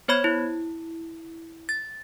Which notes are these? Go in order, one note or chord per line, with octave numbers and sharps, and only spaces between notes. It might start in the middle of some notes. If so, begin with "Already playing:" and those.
B3 C5 C#5 B5 G#6
E4
A6